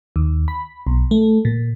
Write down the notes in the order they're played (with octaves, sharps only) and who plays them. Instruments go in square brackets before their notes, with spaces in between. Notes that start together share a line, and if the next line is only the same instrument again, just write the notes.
[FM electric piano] D#2
B5
B1
A3
A#2